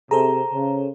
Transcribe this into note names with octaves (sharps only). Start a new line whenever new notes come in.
C3 G#4 A4 C5 A#5
C#3